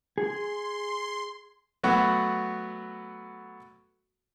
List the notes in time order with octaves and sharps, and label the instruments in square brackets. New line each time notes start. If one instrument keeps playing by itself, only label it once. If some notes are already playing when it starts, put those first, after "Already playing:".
[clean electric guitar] G#4 [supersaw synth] C6
[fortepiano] F#3 A3 B3 F#4